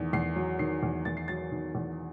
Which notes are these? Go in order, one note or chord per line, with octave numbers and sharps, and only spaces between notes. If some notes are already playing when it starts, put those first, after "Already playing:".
Already playing: E2 D#3
E2 C7
F#3
D#3 C7
E2
E2 A6
C7
F#3 A6
D#3
E2